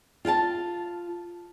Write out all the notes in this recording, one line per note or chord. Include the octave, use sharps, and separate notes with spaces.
F4 F5 G5 A5